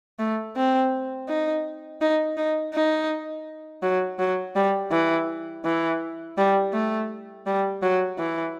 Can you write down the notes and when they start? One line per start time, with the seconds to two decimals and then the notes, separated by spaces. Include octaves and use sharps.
0.19 A3
0.56 C4
1.29 D#4
2.01 D#4
2.37 D#4
2.74 D#4
3.83 F#3
4.19 F#3
4.56 G3
4.92 E3
5.65 E3
6.38 G3
6.73 A3
7.46 G3
7.83 F#3
8.19 E3